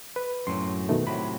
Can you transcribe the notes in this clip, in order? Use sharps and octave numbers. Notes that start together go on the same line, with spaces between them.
B4
F#2 A2 F#3 C6
B2 D#3 A3
A2 C3 F#3 B5